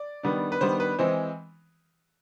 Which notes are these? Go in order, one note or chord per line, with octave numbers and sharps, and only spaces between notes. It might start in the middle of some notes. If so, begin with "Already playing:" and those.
Already playing: D5
D#3 G3 B3 D4
B4
D#3 G3 B3 D4 C5
B4
E3 G#3 C4 C5